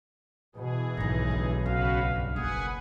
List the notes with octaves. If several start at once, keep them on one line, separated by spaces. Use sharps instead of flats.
B2 E3 G#4
B1 G#2 D#3 D#4
D2 D3
C#2 C#4 F#4 B4 F5
G2
F#1 G#4 B4 F#5 G#5